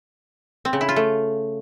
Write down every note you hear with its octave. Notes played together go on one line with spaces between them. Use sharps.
C4
C#3
E4
F4
A3